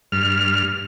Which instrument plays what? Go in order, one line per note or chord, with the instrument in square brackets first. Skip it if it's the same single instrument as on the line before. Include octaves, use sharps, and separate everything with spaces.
[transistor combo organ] G2 F6